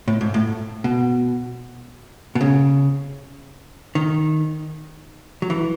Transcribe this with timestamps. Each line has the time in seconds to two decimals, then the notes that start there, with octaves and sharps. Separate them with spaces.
0.08 A2
0.21 G#2
0.34 A2
0.84 B2
2.35 B2
2.41 C#3
3.95 D#3
5.42 F#3
5.50 E3